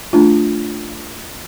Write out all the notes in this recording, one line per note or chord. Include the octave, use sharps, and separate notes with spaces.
A3 D4 F4